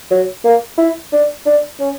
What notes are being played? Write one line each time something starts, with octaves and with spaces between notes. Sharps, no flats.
F#3
A#3
E4
D4
D4
C#4